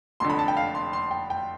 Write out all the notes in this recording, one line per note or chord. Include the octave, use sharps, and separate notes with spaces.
F1 F2 D3 C6
B5
A5
G5
F5
C6
C6
G5
G5